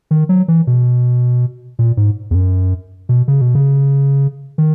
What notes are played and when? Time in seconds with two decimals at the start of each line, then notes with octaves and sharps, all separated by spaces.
0.11 D#3
0.29 F#3
0.48 E3
0.67 B2
1.79 A#2
1.97 G#2
2.31 E2
2.34 F#2
3.09 B2
3.28 C#3
3.41 B2
3.55 C#3
4.58 D#3